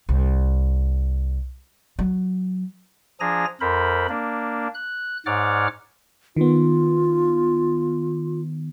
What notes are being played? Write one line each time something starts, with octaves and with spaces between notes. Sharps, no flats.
C2
F#3
F3 D4 G#4 G#5 A#5 A#6
F2 A#4 C5 B5
A#3 D4
F#6
G#2 C#5 D5 F#5 D6 F6
D#3 B3 F4